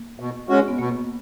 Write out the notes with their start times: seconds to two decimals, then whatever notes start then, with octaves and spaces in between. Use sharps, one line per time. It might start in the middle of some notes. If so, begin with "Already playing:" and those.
Already playing: A#3
0.19 B2
0.49 G#3 C#4 F#4
0.68 B3
0.79 B2 A#3